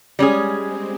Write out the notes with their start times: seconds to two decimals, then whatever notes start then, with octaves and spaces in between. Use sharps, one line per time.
0.19 G3 G#3 C#4 G#4
0.66 C4